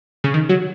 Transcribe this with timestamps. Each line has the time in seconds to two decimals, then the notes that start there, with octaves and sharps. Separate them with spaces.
0.24 C#3
0.34 D#3
0.49 F#3